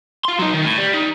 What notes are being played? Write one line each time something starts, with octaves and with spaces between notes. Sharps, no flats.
F4 C6
F#3 D#4
D#3
A2
G3
D#3